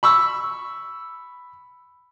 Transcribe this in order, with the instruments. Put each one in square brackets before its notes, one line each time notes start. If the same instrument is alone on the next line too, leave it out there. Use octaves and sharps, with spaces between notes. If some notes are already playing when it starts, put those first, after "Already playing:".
[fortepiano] B5 C#6 E6